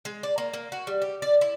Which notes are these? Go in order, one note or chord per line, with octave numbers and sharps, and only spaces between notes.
G#3
D5
A#3
A#3
F#4
G3
G4
D5
E4